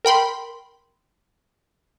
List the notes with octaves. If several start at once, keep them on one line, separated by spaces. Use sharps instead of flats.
A#4 G5 B5 C6